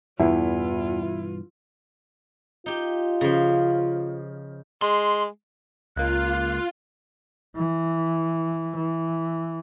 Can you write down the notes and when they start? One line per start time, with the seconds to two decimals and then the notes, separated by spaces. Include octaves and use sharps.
0.20 E2 G2 B2 E3 E4 F4
2.66 D#4 F4 G4
3.21 C#3 F3
4.82 G#3 C6
5.96 C#2 A#3 F4 F#6
7.56 E3
8.76 E3